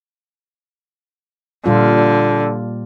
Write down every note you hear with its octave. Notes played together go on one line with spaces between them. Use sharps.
A#2 D3 G3 F4